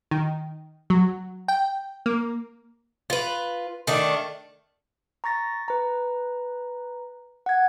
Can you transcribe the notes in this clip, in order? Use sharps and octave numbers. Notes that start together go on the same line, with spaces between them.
D#3
F#3
G5
A#3
F4 B4
D#3 A3 D4
A#5 C#6 A6 A#6
B4 A#5
F#5 G#6